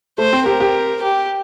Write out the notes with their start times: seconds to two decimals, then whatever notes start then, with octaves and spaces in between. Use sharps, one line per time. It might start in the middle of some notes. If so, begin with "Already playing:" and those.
0.18 A3 C5
0.33 C4
0.46 G4 A#4
0.60 G4
1.02 G4